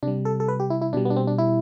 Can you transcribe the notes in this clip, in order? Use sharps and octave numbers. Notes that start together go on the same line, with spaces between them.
C3 G3 D4
A4
A4
B4
G4
E4
E4
B2 G3 D4
B3
D4
C4
D4
E4